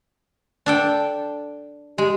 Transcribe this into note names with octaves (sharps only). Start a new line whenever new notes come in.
D4 A4 G5
G#3 G4